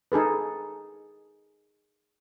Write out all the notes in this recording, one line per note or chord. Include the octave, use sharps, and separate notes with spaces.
D#4 G#4 A4 B4